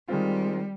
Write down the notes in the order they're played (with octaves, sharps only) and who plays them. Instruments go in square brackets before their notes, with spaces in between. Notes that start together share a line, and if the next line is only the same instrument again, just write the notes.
[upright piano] D#3 G#3 C4 F4 [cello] G3